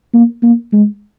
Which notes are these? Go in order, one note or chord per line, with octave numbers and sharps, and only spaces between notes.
A#3
A#3
G#3